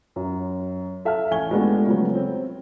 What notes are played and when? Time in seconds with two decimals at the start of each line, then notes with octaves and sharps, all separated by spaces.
0.16 F#2
1.05 A4 E5 F5 A5 F6
1.31 A1 G#5 C#6 G#6 G7
1.51 G#3 A3 B3 D4 F4 G4
1.87 C#3 F3 F#3 A3 B3
2.15 C4